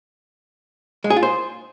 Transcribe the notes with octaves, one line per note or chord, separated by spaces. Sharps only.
G#3
G#4
F4
C5